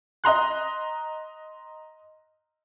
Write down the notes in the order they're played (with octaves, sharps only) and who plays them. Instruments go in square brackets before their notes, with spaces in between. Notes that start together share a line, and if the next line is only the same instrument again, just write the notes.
[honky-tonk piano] D#5 A#5 C6 F#6